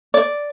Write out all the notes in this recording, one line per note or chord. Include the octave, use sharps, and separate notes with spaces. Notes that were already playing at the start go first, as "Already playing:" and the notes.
D5